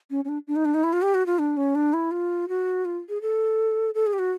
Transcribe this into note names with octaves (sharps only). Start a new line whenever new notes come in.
C#4
C#4
D4
D4
D#4
D4
D#4
E4
F4
G4
F#4
F4
D4
C#4
D4
E4
F4
F#4
F4
G#4
A4
A4
G#4
G4
F#4